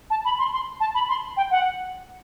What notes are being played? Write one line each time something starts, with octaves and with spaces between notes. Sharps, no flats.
A5
B5
C6
C6
A5
B5
C6
G5
F#5